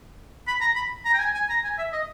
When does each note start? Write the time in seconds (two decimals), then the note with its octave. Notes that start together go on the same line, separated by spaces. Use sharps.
0.47 B5
0.61 A#5
0.75 B5
1.05 A#5
1.14 G5
1.19 G#5
1.34 G#5
1.49 A#5
1.64 G#5
1.78 E5
1.92 D#5